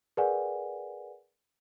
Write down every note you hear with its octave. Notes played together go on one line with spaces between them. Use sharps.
G#4 A#4 B4 D5 F#5 G#5